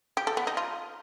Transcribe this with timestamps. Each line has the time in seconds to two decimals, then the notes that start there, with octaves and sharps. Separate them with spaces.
0.17 G4
0.27 A4
0.37 B3
0.47 D#4
0.57 F4